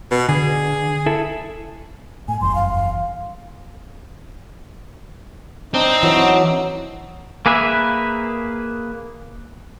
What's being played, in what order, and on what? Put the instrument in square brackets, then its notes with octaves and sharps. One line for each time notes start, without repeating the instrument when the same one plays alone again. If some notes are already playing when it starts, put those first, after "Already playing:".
[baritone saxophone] B2
[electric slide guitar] D3 [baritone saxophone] G#4
[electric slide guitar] E4 A4
[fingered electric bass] A2 [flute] G#5
[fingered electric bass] F#1 E2 G2 [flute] C6
[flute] F5
[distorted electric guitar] C4 [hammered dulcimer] D4 [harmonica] D#4
[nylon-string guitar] E3 [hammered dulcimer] F#3
[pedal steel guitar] A#3 G#4 B4 E5